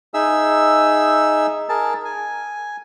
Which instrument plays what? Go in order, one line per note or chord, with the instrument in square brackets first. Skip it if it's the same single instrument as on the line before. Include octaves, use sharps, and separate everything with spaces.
[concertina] D#4 G#4 E5 E6
G#4 A#4 A5
G#5